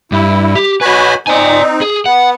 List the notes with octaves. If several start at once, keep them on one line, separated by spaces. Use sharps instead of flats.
G2 E4
G4
F#4 B4 C#5 G#5 B5
C4 D#4 D5 G#5
G#4
B3 F#5